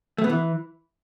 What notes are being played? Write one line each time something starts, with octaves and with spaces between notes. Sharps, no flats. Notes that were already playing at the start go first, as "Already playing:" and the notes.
A3
B3
E3